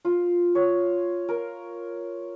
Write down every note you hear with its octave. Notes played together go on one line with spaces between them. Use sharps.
F4
C#5
A#4